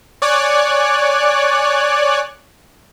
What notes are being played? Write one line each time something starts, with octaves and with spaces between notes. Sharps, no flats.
C#5 D5 G#5 F#6